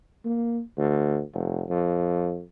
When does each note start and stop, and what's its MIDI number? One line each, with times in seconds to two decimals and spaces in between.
0.25 0.61 58
0.77 1.21 38
1.33 1.64 29
1.69 2.41 41